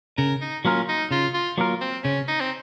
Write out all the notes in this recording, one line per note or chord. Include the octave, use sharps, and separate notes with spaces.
C#3 A#4
D#4
F#3 A#3 C#4 F4 A#4
D#4
C#3 F4
F4
F#3 A#3 F4 A#4
C4
C#3 C#4
D#4
C4